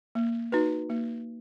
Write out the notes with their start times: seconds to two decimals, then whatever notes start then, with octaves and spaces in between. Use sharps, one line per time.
0.15 A#3
0.52 D#4 F#4 B4
0.89 A#3